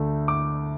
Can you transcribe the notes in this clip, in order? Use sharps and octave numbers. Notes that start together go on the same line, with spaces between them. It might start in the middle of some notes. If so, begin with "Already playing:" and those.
Already playing: D2 D3 A3
D6